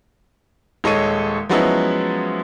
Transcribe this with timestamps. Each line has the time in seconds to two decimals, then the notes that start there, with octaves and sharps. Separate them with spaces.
0.84 D#1 G#3 A4 C#5 D#7
1.49 F3 F#3 G#3 B3 C#4 E4